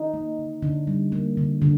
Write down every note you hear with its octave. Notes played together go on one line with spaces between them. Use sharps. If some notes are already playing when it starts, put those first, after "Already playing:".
Already playing: D#4
A#3
D3
D3 D4
G3
A#3
D3
D3